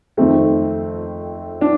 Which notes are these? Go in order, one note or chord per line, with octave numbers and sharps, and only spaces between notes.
F2 D#3 A3 C4
D4